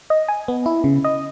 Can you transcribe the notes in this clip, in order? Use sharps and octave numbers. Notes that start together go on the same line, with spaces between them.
D#5
G#5
B3
E4
C#3
D#5